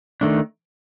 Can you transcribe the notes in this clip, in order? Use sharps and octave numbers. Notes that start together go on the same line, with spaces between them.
D#3 A3 D4